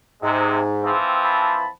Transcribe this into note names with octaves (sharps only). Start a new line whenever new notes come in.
G#2 C3 G#3
E3 F3 C4
A5 B5